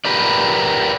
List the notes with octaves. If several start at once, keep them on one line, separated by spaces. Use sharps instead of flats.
G4 A#4 B4 D5